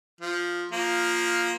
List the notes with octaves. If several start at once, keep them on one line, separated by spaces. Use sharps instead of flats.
F3
F3 A#3